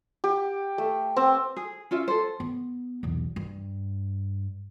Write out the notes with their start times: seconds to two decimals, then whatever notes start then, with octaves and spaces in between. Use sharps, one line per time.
0.24 G4
0.78 A3
1.16 C4
1.57 G#4
1.91 C#4 F4 E5
2.08 A4 C5
2.40 B3
3.03 B1 E2
3.36 G2